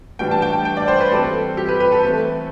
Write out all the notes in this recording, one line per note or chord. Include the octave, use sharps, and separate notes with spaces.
A2 E3 G3 D4 G5
A5
G5
G5
D5
C5
B4
E3 G3 C4 A4
G4
B4
B4
A4
E3 A3 C4